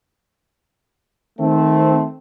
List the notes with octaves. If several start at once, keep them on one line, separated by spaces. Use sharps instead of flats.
D#3 A3 C4